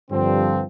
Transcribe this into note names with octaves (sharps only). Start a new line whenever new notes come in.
G2 D3 F3 C4